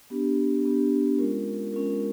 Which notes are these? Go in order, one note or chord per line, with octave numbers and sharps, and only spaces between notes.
B3 D4 G4
B3 D4 G4
G#3 C#4 F4 A#4
G#3 C#4 F4 A#4